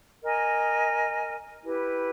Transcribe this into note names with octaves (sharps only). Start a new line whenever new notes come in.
A#4 D#5 G#5
E4 G4 B4